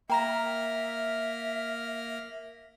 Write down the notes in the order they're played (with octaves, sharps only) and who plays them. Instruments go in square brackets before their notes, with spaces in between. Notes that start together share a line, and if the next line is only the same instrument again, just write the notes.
[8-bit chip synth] A#3 F6 A#6 [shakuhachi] E5 [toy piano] G5 A#5